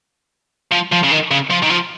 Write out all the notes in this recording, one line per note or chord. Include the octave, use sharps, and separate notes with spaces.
F3
F3
C#3
D#3
C#3
F3
D#3
F3